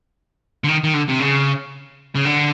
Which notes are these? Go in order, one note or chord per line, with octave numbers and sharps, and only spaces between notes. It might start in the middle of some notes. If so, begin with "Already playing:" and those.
D3
D#3
D#3
D3
C3
C#3
C#3
D3